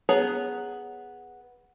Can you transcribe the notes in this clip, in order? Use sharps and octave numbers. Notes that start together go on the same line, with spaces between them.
B3 G#4 C#5 A#5